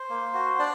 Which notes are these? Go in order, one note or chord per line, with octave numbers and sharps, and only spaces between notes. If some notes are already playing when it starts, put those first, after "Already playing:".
Already playing: C5
A#3
F#4
D4 D5